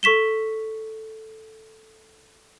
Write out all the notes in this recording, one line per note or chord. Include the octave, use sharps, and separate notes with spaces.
A4 C#6 B6 E7 G7